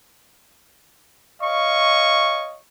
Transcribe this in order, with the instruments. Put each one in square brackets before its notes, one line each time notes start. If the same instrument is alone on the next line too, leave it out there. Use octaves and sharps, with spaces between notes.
[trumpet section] C#5 D#5 F5 C#6